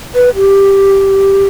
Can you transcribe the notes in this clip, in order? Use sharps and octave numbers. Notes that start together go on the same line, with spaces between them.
B4
G4